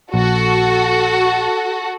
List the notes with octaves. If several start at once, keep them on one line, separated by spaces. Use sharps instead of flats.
A#1 F#4 A4